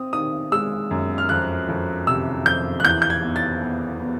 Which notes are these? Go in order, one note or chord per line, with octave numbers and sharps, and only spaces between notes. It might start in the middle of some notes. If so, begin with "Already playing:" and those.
Already playing: C4 D#6
D#3 D#6
G#3 E6
F#2
F6
F2 F#6
F2
C3 E6
F2 G6
F#6
E2 G6
G6
G#6
B3
A6
B3
B3